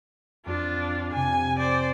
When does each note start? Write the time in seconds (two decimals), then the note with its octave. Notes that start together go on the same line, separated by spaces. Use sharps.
0.46 F2 D4 F4
1.13 F2 C3 G#5
1.59 C5 D5